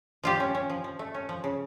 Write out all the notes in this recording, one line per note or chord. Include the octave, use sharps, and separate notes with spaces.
F3 F4 G4
C#4
C#4
F3
F3
A3
C#4
F3
C#3